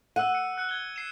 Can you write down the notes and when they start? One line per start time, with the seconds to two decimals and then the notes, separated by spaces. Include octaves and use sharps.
0.16 F#5 E6 F#6 D#7
0.35 C#7
0.57 E6 F#6 C#7
0.69 F#6 G#6 G7
0.96 C7 E7